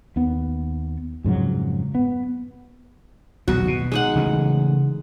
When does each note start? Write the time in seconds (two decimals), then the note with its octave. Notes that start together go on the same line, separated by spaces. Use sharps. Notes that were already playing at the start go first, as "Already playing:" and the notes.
0.16 D#2 B3
1.24 F2 G#2 C#3 F#3
1.95 B3
3.48 D#1 B1 E2 F#4
3.68 B2
3.92 G#3 D#4 F#5
4.16 C#3 E3 A3